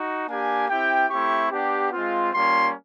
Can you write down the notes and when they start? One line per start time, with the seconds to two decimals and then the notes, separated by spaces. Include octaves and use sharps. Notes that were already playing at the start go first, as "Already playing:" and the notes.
Already playing: D#4 F#4
0.28 A#3 D4 G4 G#5
0.68 C4 E4 G4 G5
1.10 A3 C4 E4 G4 C#6
1.51 B3 D4 G4
1.92 G#3 C4 F4
2.33 G3 A#3 C#4 F4 C6